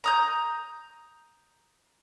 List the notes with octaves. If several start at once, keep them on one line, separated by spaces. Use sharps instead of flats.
A#5 D#6 G6